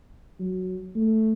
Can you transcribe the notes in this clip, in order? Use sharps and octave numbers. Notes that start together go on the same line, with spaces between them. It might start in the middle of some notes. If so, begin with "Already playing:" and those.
F#3
A3